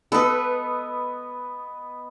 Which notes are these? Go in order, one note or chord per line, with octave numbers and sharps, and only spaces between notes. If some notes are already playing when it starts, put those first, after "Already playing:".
B3 A4 B4 D#5